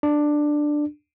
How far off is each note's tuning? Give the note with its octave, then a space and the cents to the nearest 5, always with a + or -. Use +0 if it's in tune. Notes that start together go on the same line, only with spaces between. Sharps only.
D4 +10